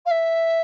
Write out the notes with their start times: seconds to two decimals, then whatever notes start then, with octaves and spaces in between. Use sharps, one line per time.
0.05 F5
0.10 E5